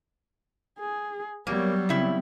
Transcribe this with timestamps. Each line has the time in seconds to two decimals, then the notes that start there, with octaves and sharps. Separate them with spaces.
0.80 G#4
1.47 F#3 G3 A#3 B3 C#5
1.89 C#3 B3 C4 E4